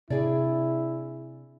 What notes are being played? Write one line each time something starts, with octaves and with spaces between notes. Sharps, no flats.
C3 D4 E4 G#4 D5